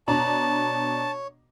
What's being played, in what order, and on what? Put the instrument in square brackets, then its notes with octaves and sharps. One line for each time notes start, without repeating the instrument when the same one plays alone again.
[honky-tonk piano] B2 D4 A#5 [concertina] C#5 [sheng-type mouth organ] A5